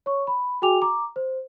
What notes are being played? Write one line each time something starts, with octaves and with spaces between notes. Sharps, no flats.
C#5 C#6
B5
F#4 G#4 G5 G#5 D6 F7
A#5 D6
C5